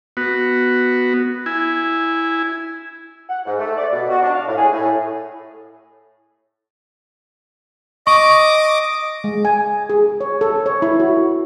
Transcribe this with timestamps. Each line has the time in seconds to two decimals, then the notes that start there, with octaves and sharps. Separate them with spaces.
0.17 B3 F#4
1.46 E4 G#5
3.28 F#5
3.45 G#2
3.58 A3
3.76 D5
3.91 B2
4.08 F#4
4.21 D4
4.32 F5
4.46 A2
4.58 G#4
4.72 A2
8.07 D#5 C#6 D6
9.24 G#3
9.45 G#5
9.90 G#4
10.21 C#5
10.41 A4
10.66 C#5
10.82 E4
11.00 F#4